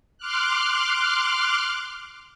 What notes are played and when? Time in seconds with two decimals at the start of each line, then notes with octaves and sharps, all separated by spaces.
0.18 C6 D6 F6 F#6